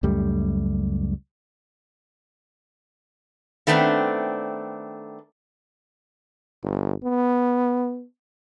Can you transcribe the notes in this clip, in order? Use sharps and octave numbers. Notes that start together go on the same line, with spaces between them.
C#2 F#2 G3 A3
D#3 A3 B3 C4 D4
G1
B3